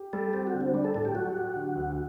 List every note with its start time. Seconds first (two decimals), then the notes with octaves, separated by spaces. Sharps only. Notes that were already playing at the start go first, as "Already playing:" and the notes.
Already playing: G4
0.13 G3 A4
0.33 C4 G4
0.47 F#4
0.54 D3
0.61 C4
0.74 G3 D4
0.84 A4
0.94 A2 A4
1.05 G4
1.15 F#3 F#4
1.35 G4
1.56 D3
1.76 D2